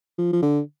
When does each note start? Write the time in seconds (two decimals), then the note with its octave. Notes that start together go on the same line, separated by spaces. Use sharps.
0.18 F3
0.33 F3
0.42 D3